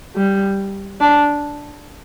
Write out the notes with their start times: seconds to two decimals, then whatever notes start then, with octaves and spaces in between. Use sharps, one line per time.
0.16 G3
1.01 D4